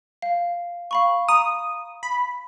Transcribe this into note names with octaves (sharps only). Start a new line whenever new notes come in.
F5
F5 B5 C#6
A#5 D#6
B5